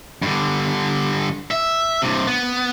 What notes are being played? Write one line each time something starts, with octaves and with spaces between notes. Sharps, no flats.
G2 D3
E5
G2 C3
B3